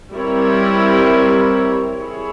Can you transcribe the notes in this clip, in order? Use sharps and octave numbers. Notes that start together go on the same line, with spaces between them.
G3 C4 E4 A#4 C#5
E4 G#4 C#5